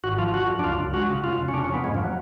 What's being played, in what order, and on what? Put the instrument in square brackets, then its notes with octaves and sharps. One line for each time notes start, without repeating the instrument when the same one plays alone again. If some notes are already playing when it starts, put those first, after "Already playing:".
[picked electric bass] G#1 [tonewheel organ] F#4
[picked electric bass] F3 [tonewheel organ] F4
[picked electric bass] D3 [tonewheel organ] F#4
[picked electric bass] F#2
[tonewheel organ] D4
[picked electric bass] C#2 [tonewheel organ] F4
[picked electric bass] C#2
[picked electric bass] G#3 [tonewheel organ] F#4
[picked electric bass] C#3
[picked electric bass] F1 [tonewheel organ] F4
[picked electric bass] F1
[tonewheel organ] C#4
[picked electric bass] C#3 [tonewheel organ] D4
[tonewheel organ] C#4
[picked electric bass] F2 [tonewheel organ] B3
[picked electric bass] G#2 [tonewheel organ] G#3
[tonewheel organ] F3
F#3